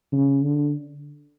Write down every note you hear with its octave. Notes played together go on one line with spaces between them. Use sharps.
C#3
D3